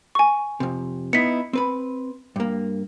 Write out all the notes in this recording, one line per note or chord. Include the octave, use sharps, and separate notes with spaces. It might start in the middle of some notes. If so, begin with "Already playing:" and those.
G#5 C#6
F2 C3
B3 D#4 E4 B6 C#7
C4 B4 B5
G2 A#3